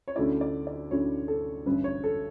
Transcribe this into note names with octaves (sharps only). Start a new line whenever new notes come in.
C#5
D2 D3 A3 C#4 E4 D5
D5
D5
D2 D3 A3 C#4 E4 C#5
A4
A1 G2 D3 B4
C#5
A4